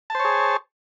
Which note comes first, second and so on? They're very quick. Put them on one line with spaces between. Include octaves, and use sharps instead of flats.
A5 C5 C#5 G#4